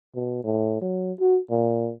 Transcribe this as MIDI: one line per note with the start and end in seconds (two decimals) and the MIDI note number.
0.15 0.41 47
0.44 0.80 45
0.82 1.12 54
1.20 1.39 66
1.50 1.92 46